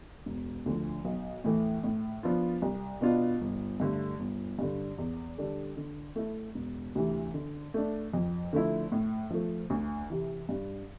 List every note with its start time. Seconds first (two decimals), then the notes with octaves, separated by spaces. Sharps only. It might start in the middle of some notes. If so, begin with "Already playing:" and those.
0.26 E1
0.66 D2 D3 F3
1.05 B1
1.44 A2 E3 A3
1.84 A2
2.23 F3 B3 D4 F4
2.62 C2
3.01 B2 B3 D4 F4
3.41 G1
3.80 G2 D3 A3
4.20 G1
4.59 G2 D3
4.98 E2
5.38 D3 G3 D4 A4
5.77 D3
6.16 A3 E4
6.55 E1
6.95 D2 C3 E3
7.34 D3
7.74 A3 D4
8.13 F2
8.53 D3 F3 A3 E4
8.92 A2
9.30 F3 A3
9.70 D2
10.10 C3 E3
10.49 G2